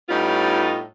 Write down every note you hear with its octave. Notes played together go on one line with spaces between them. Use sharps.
A2 G3 B3 C#4 D#4 F4